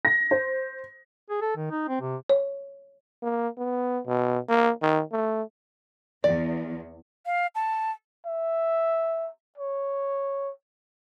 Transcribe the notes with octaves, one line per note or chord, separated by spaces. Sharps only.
A#6
C5
G#4
A4
D#3
D#4
C4
C3
C#5
A#3
B3
B2
A#3
D#3
A3
E2 D5
F5
A5
E5
C#5